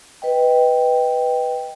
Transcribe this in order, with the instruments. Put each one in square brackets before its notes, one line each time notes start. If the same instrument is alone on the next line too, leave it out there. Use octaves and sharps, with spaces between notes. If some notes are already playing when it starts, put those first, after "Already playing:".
[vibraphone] B4 D#5 G5